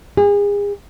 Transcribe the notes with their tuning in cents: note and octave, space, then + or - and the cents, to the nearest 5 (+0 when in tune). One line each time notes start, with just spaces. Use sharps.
G#4 -35